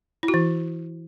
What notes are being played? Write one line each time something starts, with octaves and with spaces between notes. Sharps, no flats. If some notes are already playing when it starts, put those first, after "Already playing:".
E4
F#4
E3